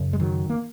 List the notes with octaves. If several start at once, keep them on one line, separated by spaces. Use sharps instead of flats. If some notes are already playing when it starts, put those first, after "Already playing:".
Already playing: F#2 C#3
G#3
D#3 F#3
A#3